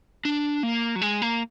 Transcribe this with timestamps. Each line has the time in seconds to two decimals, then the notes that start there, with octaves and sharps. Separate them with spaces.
0.25 D4
0.63 A#3
0.96 F#3
1.02 G#3
1.22 A#3